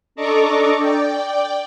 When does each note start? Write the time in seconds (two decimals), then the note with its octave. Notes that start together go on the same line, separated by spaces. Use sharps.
0.15 D4 A4 D#5 A#5 C#6 D6
0.79 D5 G5